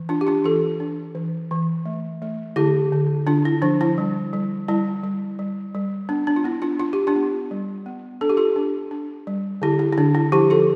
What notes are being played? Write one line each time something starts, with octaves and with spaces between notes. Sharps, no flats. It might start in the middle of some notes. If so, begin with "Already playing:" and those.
Already playing: E3
D4 F4
G4
D4 F4
E3 F4 A4
D4
E3
E3
A3
A3
D3 E4 G4
D3
D3 D4 F4
E4
F3 D4
E4
G3
G3
G3 E4
G3
G3
G3
B3 D4
D4
F4
B3 E4
D4 F4
D4 F4
G4
D4 F4
B3
G3
B3
D4 A4
G4
F4 A4
D4
D4
G3
D3 E4 G4
E4
E4
D3 D4
E4
F3 E4 G4
F4 A4